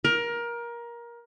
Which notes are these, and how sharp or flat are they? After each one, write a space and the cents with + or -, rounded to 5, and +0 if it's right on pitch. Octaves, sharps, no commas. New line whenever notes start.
A#4 +20